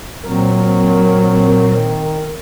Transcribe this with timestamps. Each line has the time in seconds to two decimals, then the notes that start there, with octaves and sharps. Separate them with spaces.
0.23 A#2 F#3 C4 A#4
1.75 D#3